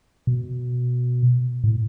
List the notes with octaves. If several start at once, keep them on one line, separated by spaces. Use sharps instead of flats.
B2
A2